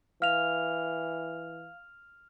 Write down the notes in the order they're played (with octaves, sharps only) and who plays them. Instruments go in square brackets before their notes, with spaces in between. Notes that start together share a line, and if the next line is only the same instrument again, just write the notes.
[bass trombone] E3 [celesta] F5 [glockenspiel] F6 F7